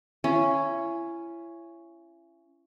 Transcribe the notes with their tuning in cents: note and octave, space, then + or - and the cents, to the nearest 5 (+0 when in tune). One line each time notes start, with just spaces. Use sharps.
C#4 +0 E4 +35